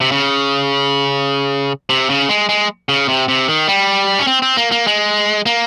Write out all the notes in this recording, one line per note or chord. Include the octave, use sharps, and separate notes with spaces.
C3
C#3
C3
C#3
G#3
G#3
C#3
C3
C3
D#3
G3
C#4
C4
C4
A#3
A#3
G#3
A#3